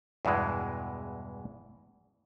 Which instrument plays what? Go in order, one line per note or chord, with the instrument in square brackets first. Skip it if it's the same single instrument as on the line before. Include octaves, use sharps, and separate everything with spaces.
[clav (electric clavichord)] E2 G2 B2 E3 G#3